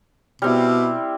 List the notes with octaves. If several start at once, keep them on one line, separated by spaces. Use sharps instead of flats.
B2 G3 C4 E4